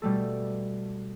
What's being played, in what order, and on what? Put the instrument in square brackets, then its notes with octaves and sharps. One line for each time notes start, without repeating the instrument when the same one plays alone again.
[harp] B2 G3 A3 A4